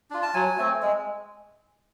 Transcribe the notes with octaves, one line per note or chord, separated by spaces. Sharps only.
D4 F4
A5
F#3 G#5
A3 C4
G#3